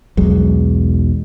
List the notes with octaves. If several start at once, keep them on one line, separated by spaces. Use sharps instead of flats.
B1 E2 F#3 G#3